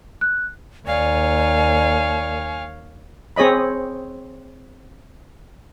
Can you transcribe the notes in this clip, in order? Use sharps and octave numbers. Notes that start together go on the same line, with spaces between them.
F#6
D#2 C#5 D5 F5 G#5
C4 G#4 C#5 D#5 B5